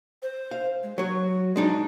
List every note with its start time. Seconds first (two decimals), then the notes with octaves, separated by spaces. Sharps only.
0.22 C5
0.51 F5
0.83 G#3
0.98 F#3 F#4 C#5
1.56 G#3 D4 D#4